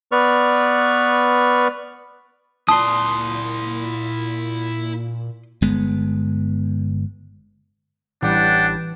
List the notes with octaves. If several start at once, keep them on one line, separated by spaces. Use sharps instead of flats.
B3 B4 D5 C#6 F6
A#2 E4 D5 A5 C6 D#6
G1 G#3 B3
A1 E3 G3 D4 F#5 G5